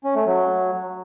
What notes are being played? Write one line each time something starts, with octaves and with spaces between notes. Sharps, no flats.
C#4
A3
F#3